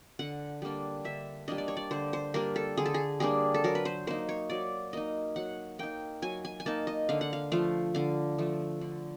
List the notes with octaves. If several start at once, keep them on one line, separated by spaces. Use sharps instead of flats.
D3 F#5
G3 A#3 D4
D3 E5
G3 A#3 D4 D#5
D5
C#5
D5
D3 C5
C5
G3 A#3 D4 A#4
A4
D3 G#4
A4
G#4
G3 A#3 D4 G#4
A4
F#3 A#4
B4
C5
A#3 D#4 C5
C#5
F#3 D5
A#3 D#4 D#5
F#3 F#5
A#3 D#4 G5
F#3 G#5
G#5
G#5
A#3 D#4 A5
D#5
D3 F5
F#5
F5
F3 A3 F5
D3 F5
F3 A3
D3